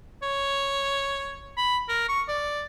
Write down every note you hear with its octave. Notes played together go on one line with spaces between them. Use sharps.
C#5
B5
A#4
C#6
D5